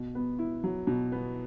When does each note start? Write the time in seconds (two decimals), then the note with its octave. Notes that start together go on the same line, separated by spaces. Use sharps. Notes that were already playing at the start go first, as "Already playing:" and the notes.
Already playing: B2
0.15 B3
0.39 E4
0.63 F#3
0.87 B2
1.12 B3